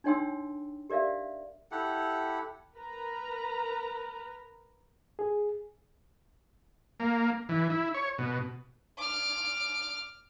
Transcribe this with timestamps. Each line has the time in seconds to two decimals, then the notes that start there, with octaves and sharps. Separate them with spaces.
0.04 D4 D#4 C#5 G5 C6 E6
0.90 G4 A#4 D5 E5 F5
1.72 E4 G4 A4 F#5
2.74 A#4 B4 A#5
5.19 G#4
7.00 A#3
7.49 E3
7.70 E4
7.94 C#5
8.18 B2
8.97 D6 F6